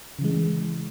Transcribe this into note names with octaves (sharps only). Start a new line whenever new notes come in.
C#3 E3 G#3